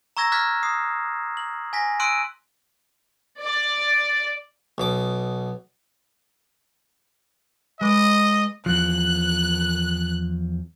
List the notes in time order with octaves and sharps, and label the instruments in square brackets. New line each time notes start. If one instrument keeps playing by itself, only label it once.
[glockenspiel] A#5 C#6 E6 G#6 A#6 E7
D6 F6 F#6 G#6 B6 E7
D#6 C7
F#7
G#5 A#6 B6
C6 E6 F#6 D7 D#7
[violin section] D5
[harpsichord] B1 B2 D6
[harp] G#3 B4 D6 [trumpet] D#5
[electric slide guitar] E2 F3 [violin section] F#6